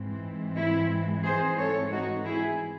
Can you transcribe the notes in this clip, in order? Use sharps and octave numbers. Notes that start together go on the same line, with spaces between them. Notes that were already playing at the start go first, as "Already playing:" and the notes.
Already playing: G#2 E3 G#3 C4
E4
G#4 C5
A4 C#5
D#4 F#4
E4 G#4